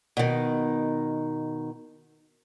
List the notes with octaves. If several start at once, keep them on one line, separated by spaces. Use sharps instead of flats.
B2 D#3